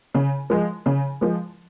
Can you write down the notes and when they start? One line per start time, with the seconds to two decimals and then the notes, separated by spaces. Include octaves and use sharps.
0.14 C#3
0.50 F3 G#3
0.86 C#3
1.21 F3 G#3